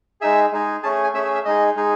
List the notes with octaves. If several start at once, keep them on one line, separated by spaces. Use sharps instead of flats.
G#3 D#4 G#4 E5
G#3 D#4 G#4
A3 C#4 G#4 A5
G#5
A3 C#4 G#4 E5
E5
E5
G#3 D#4 G#4 D#5
G#3 D#4 G#4